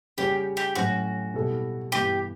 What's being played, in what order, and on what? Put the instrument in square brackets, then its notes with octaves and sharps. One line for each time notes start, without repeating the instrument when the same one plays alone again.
[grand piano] C#3 G3 C#4 F#4 C#5 [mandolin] G4
[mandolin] G4
[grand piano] A2 F#3 C#4 [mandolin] F#4
[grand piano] B2 G3 B3 E4 A4
[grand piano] G2 E3 B3 [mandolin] G4